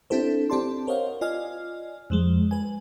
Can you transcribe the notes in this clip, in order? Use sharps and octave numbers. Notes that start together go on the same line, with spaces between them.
C4 D4 E4 G4 A4 C5
C4 G4 D5 A5 C6
A#4 C5 C#5 D#5 F5 F#5
F4 D5 D#5 G#5 F6
F2 F3 G#3
B4 G#5